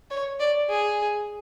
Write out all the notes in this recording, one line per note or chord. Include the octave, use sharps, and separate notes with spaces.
C#5
D5
G#4